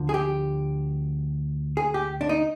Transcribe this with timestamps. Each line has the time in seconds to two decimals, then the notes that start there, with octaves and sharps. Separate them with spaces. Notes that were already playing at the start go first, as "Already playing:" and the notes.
Already playing: D2 D3 F3
0.09 G#4
0.14 G4
1.77 G#4
1.94 G4
2.21 D4
2.29 D#4